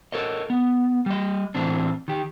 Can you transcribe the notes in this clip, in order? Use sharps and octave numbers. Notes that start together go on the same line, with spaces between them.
A4 A#4 C#5 D#5
B3
G3 D#5
A2 E3 C4 D4
D#3 G4